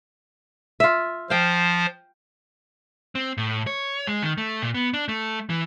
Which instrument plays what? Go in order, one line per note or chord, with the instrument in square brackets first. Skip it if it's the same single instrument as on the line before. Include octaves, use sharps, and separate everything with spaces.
[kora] F4 E5
[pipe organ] F3 C5 [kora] F5 G5
[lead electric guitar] C4
A2
C#5
G#3
D#3
A3
A#2
B3
D4
A3
E3